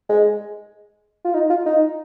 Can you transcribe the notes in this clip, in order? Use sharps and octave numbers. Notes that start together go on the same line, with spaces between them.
G#3
F4
D#4
F4
D#4